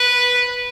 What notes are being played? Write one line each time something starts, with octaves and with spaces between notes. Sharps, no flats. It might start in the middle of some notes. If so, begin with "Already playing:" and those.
Already playing: B4